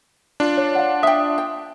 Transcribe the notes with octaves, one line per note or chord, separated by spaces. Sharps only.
D4 F4
C#5
F5 F#5
E5 G5 D#6
G5